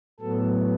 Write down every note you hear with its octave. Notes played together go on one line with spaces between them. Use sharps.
A2 F#3 B3 A4